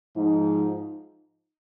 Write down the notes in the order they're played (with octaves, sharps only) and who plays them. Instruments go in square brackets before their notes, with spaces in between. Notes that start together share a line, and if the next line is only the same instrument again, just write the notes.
[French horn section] G#2 F3 G#3 D#4